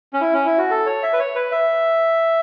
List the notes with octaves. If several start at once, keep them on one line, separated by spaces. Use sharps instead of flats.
C#4
E4
C#4
E4
F#4
A4
C#5
E5
B4
C#5
B4
E5